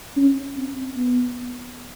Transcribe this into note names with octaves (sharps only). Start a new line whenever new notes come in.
C#4
C4
B3